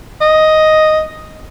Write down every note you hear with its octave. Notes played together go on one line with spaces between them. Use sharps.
D#5